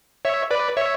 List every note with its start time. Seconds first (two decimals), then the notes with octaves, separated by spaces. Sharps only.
0.25 C#5 E5
0.51 B4 D5
0.77 C#5 E5